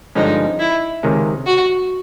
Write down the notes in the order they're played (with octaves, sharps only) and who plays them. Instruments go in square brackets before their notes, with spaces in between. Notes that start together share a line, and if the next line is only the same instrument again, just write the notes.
[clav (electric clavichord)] G2 D3 F3 G#3 C#4 [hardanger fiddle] D#4
[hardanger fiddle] E4
[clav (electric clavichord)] C#2 C3 D#3 G#3 C#4
[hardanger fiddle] F#4